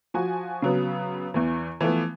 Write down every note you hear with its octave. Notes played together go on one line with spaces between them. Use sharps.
F3 F#4 G#5
C#3 F#3 B3
E2 E3
E3 F3 A3 B3